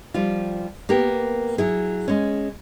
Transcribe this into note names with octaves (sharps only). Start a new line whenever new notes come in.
F3 G3 F4
A#3 B3 G4 A#4
F#3 E4 G#4
G#3 C#4